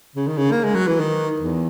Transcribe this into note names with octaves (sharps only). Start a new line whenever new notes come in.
C#3
D#3
C#3
A#3
G#3
F#3
E3
D#3
E2